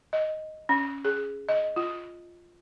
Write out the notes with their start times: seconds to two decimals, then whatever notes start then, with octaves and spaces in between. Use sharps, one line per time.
0.13 D#5
0.69 C#4
1.05 G#4
1.49 D#5
1.76 F4